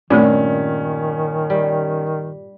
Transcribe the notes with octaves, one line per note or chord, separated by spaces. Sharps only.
G2 A#2 D#3 A3 C4 C#4 F4
G3